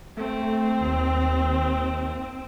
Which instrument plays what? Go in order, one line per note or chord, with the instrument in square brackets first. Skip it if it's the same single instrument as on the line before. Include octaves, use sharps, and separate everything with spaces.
[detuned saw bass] A3 [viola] C4
[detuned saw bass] D#2